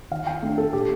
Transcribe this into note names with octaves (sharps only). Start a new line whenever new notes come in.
D#3 F5
G5
A3 D4
A4
A#2 G4